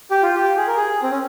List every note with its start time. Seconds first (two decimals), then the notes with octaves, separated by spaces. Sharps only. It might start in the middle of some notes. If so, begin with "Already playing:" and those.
0.11 G4
0.23 F4
0.35 G4
0.57 G#4
0.67 A#4
0.77 G#4
1.03 C4
1.11 C#4